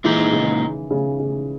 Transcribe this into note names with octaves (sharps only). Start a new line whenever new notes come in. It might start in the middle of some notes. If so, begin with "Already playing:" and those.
A#2 E3 G#3 D#4
D#3
C#3
D#3
C#3
C#3